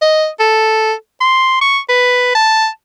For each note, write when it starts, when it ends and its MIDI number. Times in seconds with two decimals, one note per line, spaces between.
0.02 0.28 75
0.40 0.93 69
1.21 1.59 84
1.61 1.79 85
1.89 2.30 71
2.35 2.67 81